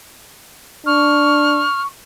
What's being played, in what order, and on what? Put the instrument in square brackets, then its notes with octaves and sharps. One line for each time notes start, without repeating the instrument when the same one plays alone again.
[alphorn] D4 [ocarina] C#6 [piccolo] F6